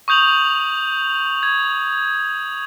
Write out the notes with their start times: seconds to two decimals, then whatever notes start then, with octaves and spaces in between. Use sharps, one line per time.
0.08 C#6 D#6 G6 F7 F#7
1.43 G#6